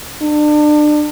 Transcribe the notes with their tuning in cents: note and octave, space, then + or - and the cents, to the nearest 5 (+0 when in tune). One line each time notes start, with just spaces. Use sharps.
D4 +30